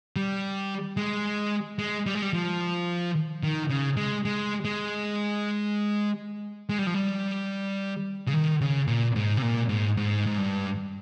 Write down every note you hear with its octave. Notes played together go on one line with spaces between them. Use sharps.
G3
G#3
G#3
G3
G#3
G3
F3
D#3
C#3
G#3
G#3
G#3
G#3
G3
F3
G3
C#3
D#3
C#3
A#2
G#2
C3
A#2
G#2
G#2
G#2
G2